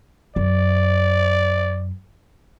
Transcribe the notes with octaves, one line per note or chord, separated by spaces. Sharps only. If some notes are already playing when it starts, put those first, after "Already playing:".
F#2 D5